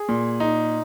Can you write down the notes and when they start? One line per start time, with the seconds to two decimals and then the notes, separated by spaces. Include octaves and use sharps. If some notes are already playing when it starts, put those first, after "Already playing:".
Already playing: G#4
0.09 A#2
0.40 D#4